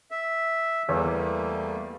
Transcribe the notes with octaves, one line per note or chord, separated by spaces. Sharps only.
E5
E2 G3 A3 A#3